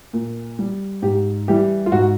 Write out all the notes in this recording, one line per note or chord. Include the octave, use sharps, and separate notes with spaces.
A#2
G3
G#2 G4
E3 G3 G4
F4
G#2 F#4